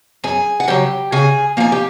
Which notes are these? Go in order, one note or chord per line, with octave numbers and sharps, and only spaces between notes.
F#2 G#4 G#5
F#5
C#3 F#3 G4 G5
C#3 G#4 G#5
F3 A#3 G#5
G4 G5